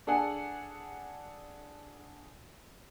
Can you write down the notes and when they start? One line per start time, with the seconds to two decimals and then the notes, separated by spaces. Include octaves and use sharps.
0.07 D4 G#4 A4 F#5 G#5